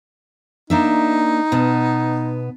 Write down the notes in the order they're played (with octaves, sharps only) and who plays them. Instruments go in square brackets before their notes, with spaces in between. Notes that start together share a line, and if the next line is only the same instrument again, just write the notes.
[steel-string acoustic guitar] A#3 D4 E5 [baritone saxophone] D#4
[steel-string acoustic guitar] B2 B3 A5